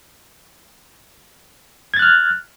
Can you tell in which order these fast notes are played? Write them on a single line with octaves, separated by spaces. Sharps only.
G#6 A6 F#6 F6